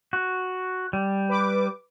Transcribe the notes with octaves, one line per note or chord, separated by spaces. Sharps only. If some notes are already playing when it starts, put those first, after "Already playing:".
F#4
G3
B4 D6